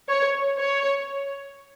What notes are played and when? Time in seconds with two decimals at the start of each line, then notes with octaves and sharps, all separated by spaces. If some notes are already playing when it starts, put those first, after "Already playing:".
0.09 C#5
0.58 C#5